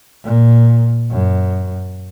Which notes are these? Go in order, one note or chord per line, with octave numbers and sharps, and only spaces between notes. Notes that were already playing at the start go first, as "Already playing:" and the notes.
A#2
F#2